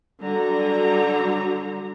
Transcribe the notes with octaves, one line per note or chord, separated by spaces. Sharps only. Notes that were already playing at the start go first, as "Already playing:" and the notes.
D3 F#3 G3 A#5